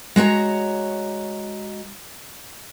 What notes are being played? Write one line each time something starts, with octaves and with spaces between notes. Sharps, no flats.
G#3 F#4 C#5 A#5